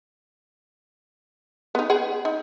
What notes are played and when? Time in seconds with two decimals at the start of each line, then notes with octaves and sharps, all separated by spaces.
1.75 B3 D#4
1.90 G#4 F#5
2.25 D#4